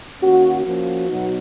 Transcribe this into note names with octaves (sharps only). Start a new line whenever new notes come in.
D#3 A#3 C#4 F#4
F3 A#3 C#4 F#4
B2 F#3 B3 D#4